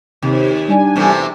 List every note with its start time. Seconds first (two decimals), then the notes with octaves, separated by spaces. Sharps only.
0.22 D#2 C3
0.68 G3 D4 G#5
0.96 E2 C3 A3